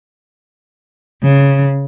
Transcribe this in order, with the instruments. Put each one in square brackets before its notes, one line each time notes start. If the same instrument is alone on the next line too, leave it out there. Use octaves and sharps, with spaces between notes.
[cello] C#3